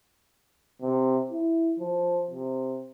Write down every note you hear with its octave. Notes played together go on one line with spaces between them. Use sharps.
C3
E4
F3
C3